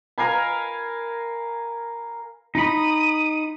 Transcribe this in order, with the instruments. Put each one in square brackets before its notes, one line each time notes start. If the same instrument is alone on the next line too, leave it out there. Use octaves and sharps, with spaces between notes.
[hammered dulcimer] A#4 F5 G#5 B5
[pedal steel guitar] D#4 B5 [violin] D#6